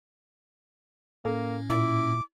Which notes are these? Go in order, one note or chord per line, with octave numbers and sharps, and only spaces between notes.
A2 A#3 C#4 A4
A#2 E4 D6